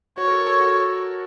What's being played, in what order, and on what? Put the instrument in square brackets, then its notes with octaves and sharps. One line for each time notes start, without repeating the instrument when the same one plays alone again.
[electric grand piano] F#4 [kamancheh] C#5
[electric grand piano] A#4
A4
A4
F#4